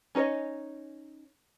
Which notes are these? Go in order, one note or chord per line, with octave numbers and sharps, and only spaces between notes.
C#4 D#4 B4 C#5 D#5